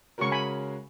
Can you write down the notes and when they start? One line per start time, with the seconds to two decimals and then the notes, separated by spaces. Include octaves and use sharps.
0.18 C#3 G#3 C#4 F#4 A#4 C#6
0.32 G#5 B5